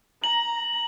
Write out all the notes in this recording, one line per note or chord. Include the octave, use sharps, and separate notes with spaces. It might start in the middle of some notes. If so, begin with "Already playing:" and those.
A#5 F#7